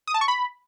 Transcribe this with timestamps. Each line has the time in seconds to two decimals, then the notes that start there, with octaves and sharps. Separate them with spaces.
0.07 D#6
0.14 A5
0.21 C#6
0.28 B5